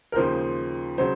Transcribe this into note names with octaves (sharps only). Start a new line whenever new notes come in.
A#4
D#2 C#3 F3 C5
C#3 F#3 C5